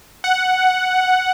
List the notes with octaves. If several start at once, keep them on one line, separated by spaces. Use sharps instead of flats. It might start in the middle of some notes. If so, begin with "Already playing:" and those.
F#5